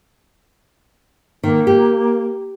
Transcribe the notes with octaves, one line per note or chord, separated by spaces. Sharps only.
D#3 A#3
G4